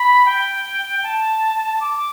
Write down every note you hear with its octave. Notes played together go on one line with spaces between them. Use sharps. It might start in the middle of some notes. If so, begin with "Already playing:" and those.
Already playing: B5
G5
A5
D6